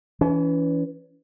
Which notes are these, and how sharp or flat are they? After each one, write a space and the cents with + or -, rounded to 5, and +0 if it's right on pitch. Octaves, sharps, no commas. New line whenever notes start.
E3 +10 C#4 +40